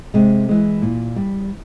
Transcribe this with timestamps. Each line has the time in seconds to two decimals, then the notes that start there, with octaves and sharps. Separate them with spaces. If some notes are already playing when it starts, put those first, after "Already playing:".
0.14 C3 G#3
0.49 E3 G#3
0.82 A#2
1.16 G3